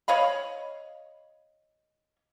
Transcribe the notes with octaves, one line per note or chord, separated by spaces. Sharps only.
C#5 D#5 F5 B5